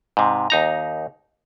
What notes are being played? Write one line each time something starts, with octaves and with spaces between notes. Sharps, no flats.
G#2 C3
D#2 D#4 A#5